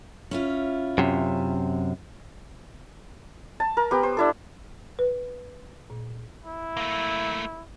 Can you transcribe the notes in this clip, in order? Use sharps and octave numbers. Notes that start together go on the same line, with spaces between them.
C#4 E4 F4
F#2 C3
A5
A#4
B3 G4
C5
D4 E4 A4
B4
A#2
E4
A3 A#3